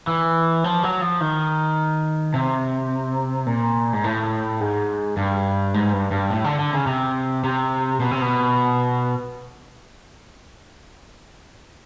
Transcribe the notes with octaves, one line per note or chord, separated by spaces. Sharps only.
E3
F3
F#3
F3
D#3
C3
A#2
G#2
A2
G#2
G2
G#2
G2
G2
A2
D3
D3
C#3
C3
C3
B2
C3
B2